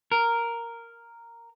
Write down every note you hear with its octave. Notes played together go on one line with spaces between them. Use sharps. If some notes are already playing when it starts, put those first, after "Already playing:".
A#4